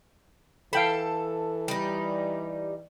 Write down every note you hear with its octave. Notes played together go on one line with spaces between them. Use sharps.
E3 A4 F5 G5 B5
G3 D#4